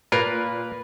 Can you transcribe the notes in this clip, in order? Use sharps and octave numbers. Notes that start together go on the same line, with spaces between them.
A#2 A#3 F4 A#4 B4